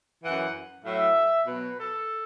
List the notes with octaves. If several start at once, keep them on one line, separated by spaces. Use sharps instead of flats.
F#2 E3 F#5
A2 F#3 E5
B2 F#3 B4
A4